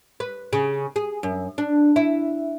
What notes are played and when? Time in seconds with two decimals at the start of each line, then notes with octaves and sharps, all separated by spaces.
0.20 B4
0.53 C#3
0.96 G#4
1.23 F#2
1.58 D4
1.96 E4